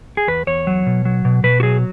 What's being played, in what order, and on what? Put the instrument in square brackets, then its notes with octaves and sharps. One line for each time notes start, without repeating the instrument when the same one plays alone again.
[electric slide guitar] G#4
E2 B4
E2 C#5
F#3
B2
F#3
B2
B2 B4
F#4
F#3 G#4